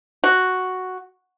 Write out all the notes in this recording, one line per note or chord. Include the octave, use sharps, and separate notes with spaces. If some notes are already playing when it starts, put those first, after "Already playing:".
F#4